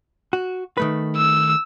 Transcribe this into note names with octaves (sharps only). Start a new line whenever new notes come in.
F#4
D#3 A3 B4
E6